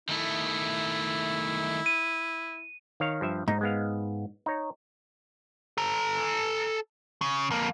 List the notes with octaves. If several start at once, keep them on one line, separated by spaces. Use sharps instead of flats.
D#3 A3 E4
D#7
D#3 C#5 F5
G2 F3 E5
G#2 D#4
G#3 B3 F5
D#4 C#5
A4 A#5
C#3
F2 A#3